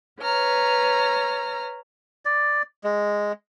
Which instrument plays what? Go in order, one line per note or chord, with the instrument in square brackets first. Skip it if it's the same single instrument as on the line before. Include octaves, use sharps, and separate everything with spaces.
[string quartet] B4 C#5 A#5 F6
[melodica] D5
G#3